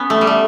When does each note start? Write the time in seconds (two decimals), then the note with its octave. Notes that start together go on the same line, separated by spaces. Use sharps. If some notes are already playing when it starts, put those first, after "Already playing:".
Already playing: B3 C#4
0.10 A3
0.21 G3
0.27 A3